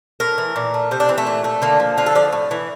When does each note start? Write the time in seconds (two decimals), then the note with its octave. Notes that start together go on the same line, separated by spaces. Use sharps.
0.20 A2 A#4
0.38 E3
0.56 A#2
0.74 A3
0.91 C3 C5
1.00 D4
1.09 E3 C4
1.18 A3
1.27 A#2
1.44 A3
1.62 D3 A#3
1.80 F3
1.97 D3 F4
2.06 A4
2.15 F3 D5
2.32 A2
2.51 E3